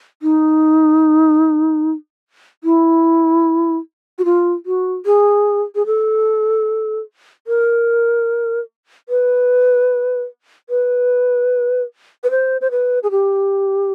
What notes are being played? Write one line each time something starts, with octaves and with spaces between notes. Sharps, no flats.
D#4
E4
F#4
F4
F#4
G#4
G#4
A4
A#4
B4
B4
B4
C5
C5
B4
G#4
G4